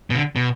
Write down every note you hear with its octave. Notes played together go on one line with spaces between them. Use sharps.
B2
D3
B2